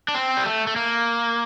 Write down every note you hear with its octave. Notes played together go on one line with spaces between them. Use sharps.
D4
C4
G3
A3
A3
A#3